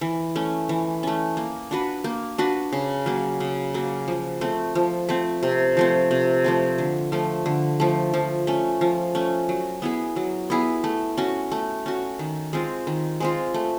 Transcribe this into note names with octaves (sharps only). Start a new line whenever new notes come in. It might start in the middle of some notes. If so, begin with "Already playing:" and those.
E3
A3 C#4
E3
A3 C#4
A#3
D4 F#4 B4
A#3
D4 F#4 B4
C#3
F#3 A#3
C#3
F#3 A#3
F3
A3 C4
F3
A3 C4
C3
F3 A3 C4
C3
F3 A3 C4
D3
F3 A3
D3
F3 A3
F3
A3 C#4
F3
A3 C#4
F#3
B3 E4 G#4
F#3
B3 E4 G#4
A3
C#4 F#4
A3
C#4 F#4
D#3
G#3 C4 F4
D#3
G#3 C4 F4
A3